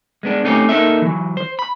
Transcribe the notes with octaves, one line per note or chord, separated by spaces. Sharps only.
G#3 B3 D4
A3 C4 C#4 D#4 G4
A#3 D#4 A4 E5
E3 F#3
C5
B5